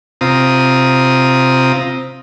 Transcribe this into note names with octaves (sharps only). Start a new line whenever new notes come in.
C3 C4 F4 A#5 D#6